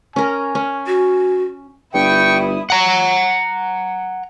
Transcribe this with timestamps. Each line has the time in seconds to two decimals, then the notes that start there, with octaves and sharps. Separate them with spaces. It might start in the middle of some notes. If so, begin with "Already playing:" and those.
0.16 C#4 A#4 G#5
0.55 C#4
0.87 F#4
1.94 G1 G2 E4 G5 C#6 D#6
2.70 F#5 A#5